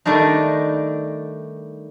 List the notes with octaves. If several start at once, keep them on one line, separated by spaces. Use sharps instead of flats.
D#3 G3 A3 D4 D#4